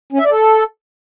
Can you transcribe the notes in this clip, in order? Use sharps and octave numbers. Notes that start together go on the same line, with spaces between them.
C#4
E5
D5
A4